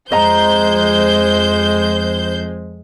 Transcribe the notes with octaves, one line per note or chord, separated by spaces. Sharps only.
F2 G#3 C5 D#5 A#5 G6